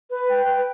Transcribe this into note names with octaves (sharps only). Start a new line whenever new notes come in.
B4
G5
B4